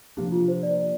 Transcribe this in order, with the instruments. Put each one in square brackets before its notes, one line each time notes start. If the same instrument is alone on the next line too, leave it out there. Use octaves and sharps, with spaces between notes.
[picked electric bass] C3 F3 A#3 D4 [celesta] G4
[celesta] F4
C5
D5